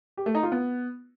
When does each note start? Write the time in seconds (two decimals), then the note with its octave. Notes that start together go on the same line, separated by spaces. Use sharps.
0.17 G4
0.26 A3
0.35 D#4
0.43 F4
0.52 B3